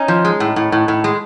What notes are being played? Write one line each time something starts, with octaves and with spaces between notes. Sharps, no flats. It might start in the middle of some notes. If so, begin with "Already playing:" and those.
Already playing: C#4 D#4
F3
G#3
A2
A2
A2
A2
G#3